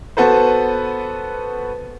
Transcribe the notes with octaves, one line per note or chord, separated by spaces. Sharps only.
B3 F#4 A4 B4 C5